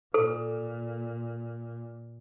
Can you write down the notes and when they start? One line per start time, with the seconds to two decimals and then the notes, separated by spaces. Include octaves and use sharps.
0.14 A#2 A4